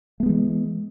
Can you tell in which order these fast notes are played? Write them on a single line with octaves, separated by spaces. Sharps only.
A3 B3 G#3 E3